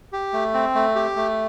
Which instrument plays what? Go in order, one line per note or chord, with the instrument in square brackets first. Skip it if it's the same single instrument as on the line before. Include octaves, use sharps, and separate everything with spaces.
[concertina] G4
A3
C4
A3
G4
A3